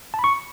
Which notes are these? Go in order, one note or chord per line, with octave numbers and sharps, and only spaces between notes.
A5
B5
C#6